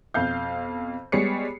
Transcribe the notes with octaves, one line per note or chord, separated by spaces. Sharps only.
F2 B2 F5 G6
G3 G#3 B3 C#5 C7 C#7